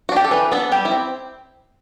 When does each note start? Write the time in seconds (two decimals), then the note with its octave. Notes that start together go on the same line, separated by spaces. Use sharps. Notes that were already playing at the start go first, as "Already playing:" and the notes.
0.09 F#4
0.12 D4 G4
0.24 A4
0.31 E3 B4
0.52 B3 D4 A4
0.72 G3 G4
0.85 E4
0.91 C4